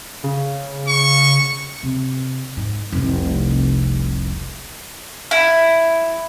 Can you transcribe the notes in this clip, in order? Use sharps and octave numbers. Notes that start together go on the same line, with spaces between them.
C#3
C#6
C3
G#2
F1 C2
E4